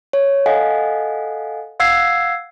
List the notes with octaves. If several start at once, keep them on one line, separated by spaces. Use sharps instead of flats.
C#5
A4 D#5 F5 F#5 G#5
F5 F#5 E6 G#6 C7